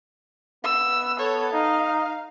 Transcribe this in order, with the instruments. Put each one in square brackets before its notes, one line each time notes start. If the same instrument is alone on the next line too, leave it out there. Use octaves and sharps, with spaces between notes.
[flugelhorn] B3 [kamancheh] E6
[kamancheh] A4 C#5
[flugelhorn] D#4 [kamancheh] F5